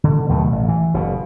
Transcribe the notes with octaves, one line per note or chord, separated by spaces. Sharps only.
D3
D#2 B2 F#3 A3
A1
E3
F#1 B2